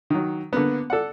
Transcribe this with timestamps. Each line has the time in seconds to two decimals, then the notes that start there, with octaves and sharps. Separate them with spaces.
0.10 D#3 F#3
0.53 D3 A#3 B3
0.90 A4 D5 F#5